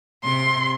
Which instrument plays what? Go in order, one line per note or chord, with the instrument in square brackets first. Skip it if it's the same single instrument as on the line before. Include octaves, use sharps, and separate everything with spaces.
[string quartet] C3 [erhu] C6